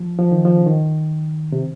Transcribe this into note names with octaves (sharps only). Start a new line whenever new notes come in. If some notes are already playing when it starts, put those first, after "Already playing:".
Already playing: F3
F3
D#3
F3
C#3
D#3
C3